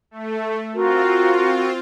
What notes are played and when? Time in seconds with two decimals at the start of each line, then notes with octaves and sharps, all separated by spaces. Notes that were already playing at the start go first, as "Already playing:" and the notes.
0.11 A3
0.74 C4 F4 F#4 A#4